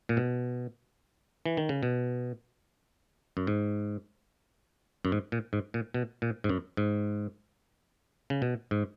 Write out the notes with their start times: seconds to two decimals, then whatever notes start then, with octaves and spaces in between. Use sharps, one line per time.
0.09 A#2
0.17 B2
1.46 E3
1.57 D#3
1.69 C#3
1.83 B2
3.37 F#2
3.47 G#2
5.05 F#2
5.12 G#2
5.32 A#2
5.53 G#2
5.74 A#2
5.94 B2
6.22 A#2
6.44 G#2
6.49 F#2
6.77 G#2
8.30 C#3
8.42 B2
8.71 G#2